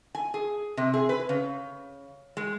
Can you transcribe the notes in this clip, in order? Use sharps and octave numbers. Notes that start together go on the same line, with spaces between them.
G#5
G#4
C3
G#4
B4
C#3
G#3